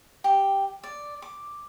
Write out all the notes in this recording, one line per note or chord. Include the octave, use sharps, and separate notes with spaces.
G4
D5
D6